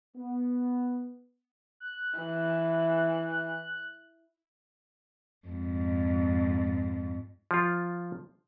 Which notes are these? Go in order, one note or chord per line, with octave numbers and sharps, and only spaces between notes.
B3
F#6
E3
F2 G#2
F3 F4